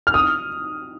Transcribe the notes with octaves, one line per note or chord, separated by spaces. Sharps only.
F6
D#6